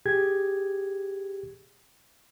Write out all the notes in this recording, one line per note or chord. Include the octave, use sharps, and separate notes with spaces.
G4 G#4 G#6